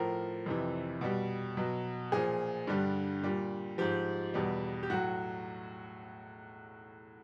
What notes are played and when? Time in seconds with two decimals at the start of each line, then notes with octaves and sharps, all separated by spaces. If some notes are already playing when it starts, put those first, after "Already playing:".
Already playing: A2 F3 A#4
0.46 F2 C3 E3
1.01 B2 G3
1.57 B2 F#3
2.12 A#2 F3 G#4
2.67 G2 D3 G3
3.23 A#2 G3
3.78 G#2 F3 G4
4.34 E2 B2 G3
4.83 G4
4.90 A2 F#3 F#4